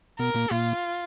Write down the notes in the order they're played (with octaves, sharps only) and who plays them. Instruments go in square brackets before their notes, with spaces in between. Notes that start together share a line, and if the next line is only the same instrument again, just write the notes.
[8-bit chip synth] B2 B3 [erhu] A#4
[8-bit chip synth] A#2 A#3
[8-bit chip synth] A#2 A#3 [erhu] F4